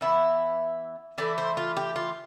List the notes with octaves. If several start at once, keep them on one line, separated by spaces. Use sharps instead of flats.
E3 B3 E4 E5
E3 A3 E4 D5
C5
F4
G4
F4